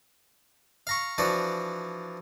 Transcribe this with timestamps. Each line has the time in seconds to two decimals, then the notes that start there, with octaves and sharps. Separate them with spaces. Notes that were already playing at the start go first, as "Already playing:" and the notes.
0.87 F5 A#5 C#6
1.18 E3 F3 D4 F#4 D5